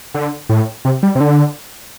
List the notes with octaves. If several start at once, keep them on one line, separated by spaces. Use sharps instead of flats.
D3
A2
C3
G3
C3
D3